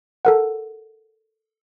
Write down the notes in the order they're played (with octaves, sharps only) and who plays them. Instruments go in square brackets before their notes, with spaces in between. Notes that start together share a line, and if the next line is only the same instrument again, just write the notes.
[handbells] A4 A#4 F#5